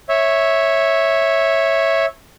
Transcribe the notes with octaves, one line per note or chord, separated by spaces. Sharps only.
C#5 E5